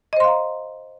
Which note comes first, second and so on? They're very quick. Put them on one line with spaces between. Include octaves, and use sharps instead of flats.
D#5 C5 C6 F5 A#5